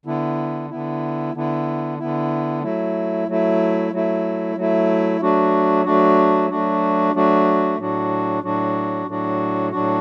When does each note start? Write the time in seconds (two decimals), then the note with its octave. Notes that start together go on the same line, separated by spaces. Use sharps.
0.06 D3 B3 E4
0.70 D3 B3 E4
1.34 D3 B3 E4
1.98 D3 B3 E4
2.63 F#3 A3 E4
3.28 F#3 A3 E4
3.92 F#3 A3 E4
4.56 F#3 A3 E4
5.21 F#3 A3 D4 F#4
5.85 F#3 A3 D4 F#4
6.50 F#3 A3 D4 F#4
7.14 F#3 A3 D4 F#4
7.79 A2 F#3 D4 F#4
8.43 A2 F#3 D4 F#4
9.07 A2 F#3 D4 F#4
9.71 A2 F#3 D4 F#4